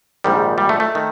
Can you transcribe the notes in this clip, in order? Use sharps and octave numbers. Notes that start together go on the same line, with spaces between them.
A#1 G#2 D#3 G3
G3
A3
A3
D#3